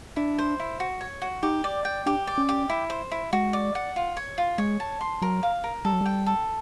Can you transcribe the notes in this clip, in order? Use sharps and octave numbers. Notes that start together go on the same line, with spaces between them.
D4 E4
C5
E4
F#4
C#5
F#4
D#4 G4
D5
G5
D4 G4
D5
C#4
G4
E4
C5
E4
G#3 F#4
D5
F#5
F4
C#5
F4
G#3 C#5
A5
C6
F#3 A#4
F5
A#4
G3 A4
F#3
G3 G5
A4